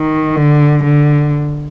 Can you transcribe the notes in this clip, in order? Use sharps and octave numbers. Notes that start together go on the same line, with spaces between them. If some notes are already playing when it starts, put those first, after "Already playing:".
Already playing: D#3
D3
D3